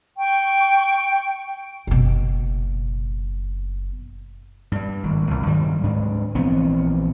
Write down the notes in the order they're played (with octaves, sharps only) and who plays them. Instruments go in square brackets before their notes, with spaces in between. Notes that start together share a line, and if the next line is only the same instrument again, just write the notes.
[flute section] G5 C#6
[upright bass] F#1 B2
[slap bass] G2 G3
G#1 A#2
C2 A#2
G2 D#3 F#3 G3
D2 G#2 D4
A#1 E3 B3 C4